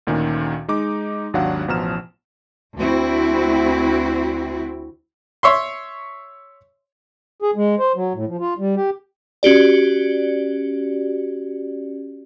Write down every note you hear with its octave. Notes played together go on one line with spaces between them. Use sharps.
D2 A#2 D#3 C#4
G#3 D#4 D6
G#1 D#2 F#3 D4 F5 F#5
A1 B2 F3 A#5 F6 E7
D2 C4 E4 F#4
C#5 E5 C6
G#4
G#3
C5
F#3
A2
F3
F4
G3
G4
C#4 F#4 G4 D5